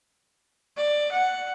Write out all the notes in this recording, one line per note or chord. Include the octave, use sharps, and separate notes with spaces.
D5
F#5